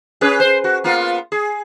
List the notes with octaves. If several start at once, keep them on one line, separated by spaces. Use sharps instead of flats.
C#4 G#4 B4
C5
F#4
A#3 B3 F4
G#4